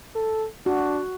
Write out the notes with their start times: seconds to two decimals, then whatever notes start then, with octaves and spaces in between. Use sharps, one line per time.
0.15 A4
0.66 D4 F#4